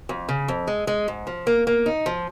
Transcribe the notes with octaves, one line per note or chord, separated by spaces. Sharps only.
F2
C#3
F2
G#3
G#3
G#2
F3
A#3
A#3
D#4
F3